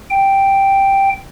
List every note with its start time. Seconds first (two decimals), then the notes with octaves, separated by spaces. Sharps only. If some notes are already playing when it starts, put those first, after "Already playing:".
0.10 G5